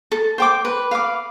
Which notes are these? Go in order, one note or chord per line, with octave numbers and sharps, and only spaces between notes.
A4
C5 G5 D6
B4
F5 B5 D6